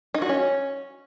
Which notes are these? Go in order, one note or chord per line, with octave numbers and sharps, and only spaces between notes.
D#4
F#4
C#4